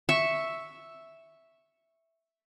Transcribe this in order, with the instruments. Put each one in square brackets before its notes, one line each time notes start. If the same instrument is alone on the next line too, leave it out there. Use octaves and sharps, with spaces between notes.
[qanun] E5 C#6